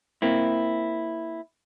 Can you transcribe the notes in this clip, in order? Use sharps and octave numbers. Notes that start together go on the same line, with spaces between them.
A#3 C4 E4